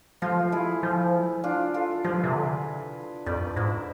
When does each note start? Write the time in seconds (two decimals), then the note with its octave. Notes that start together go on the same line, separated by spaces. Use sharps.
0.22 F3 F4 A4
0.52 E4 G#4
0.83 F3
1.44 D4 F4
1.74 F4 A4
2.04 F3 G#4 B4
2.24 C3
2.35 D3
3.26 F2 B4 D5
3.56 G#2 C5 E5